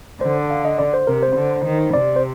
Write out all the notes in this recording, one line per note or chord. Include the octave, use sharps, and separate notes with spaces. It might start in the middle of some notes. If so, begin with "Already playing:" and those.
D3 C5
F5
D#5
D5
C5
C3 A#4
C5
D3
D#3
C3 D5
C5